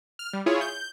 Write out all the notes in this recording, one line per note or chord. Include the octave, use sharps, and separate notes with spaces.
F6
G3
E4 F4 G#4 C#5
G6